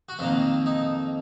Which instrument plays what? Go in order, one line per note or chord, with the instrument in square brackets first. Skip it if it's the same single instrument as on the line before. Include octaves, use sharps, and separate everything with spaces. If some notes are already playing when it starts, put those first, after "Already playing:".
[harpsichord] F#4
F2 D#3 A#3 F4
D#4